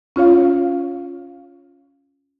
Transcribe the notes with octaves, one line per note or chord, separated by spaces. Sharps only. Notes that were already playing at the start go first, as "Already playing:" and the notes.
C#4 F4 C#5 F5